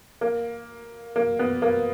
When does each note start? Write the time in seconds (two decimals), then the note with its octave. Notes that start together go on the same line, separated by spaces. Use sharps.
0.21 A#3
1.16 A#3
1.39 B3
1.62 A#3